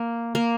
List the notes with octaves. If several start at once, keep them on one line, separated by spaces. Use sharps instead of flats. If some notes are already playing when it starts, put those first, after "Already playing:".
Already playing: A#3
A#3